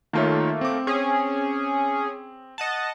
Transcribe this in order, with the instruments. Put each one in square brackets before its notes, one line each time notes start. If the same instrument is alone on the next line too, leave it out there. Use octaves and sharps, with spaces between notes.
[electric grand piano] D#3 F4 C#5 [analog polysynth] A3 A#3
[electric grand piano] C4 D6
[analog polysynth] C#4 G#4
D#5 F#5 A5